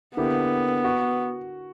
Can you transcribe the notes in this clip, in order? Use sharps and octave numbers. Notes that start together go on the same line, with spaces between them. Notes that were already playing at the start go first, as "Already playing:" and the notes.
D3 A#3 B3 E4 G4
F#4